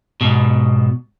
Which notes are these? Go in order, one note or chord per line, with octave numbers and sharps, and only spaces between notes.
G#2 B2